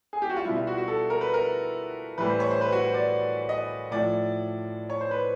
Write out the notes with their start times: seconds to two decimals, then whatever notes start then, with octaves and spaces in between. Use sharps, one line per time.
0.13 G#4
0.22 G4
0.30 F#4
0.37 F4
0.45 B2 G3 E4
0.56 F4
0.67 F#4
0.78 F#4
0.88 A4
1.10 A#4
1.21 B4
1.34 A#4
2.18 A2 E3 G3 B4
2.30 C5
2.40 C#5
2.51 C5
2.61 B4
2.72 F#4
2.84 C5
2.94 D5
3.49 D#5
3.91 A2 F3 D5
4.90 C#5
5.01 C5
5.11 B4